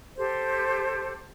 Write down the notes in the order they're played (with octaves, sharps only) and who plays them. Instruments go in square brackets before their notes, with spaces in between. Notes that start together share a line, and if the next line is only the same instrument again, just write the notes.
[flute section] G4 A4 C5